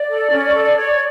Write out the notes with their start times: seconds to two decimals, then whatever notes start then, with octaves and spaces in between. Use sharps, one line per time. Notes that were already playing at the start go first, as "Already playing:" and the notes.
Already playing: D5
0.09 A4
0.31 C#4
0.54 A4
0.76 C#5